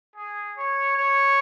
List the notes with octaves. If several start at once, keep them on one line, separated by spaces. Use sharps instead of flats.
G#4
C#5
C#5